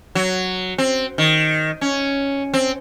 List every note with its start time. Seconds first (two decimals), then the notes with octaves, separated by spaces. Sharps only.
0.15 F#3
0.78 C4
1.18 D#3
1.81 C#4
2.54 C4